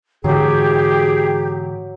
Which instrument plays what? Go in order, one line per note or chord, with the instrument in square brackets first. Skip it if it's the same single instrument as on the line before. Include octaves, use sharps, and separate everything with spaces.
[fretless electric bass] G#2 D3 E3 [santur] F#3 [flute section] G4 [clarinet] G#4